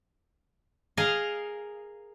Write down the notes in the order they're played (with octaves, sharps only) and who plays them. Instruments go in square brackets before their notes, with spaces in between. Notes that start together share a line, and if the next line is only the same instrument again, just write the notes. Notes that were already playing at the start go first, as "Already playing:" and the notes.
[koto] G#4 A#4 D#5 F5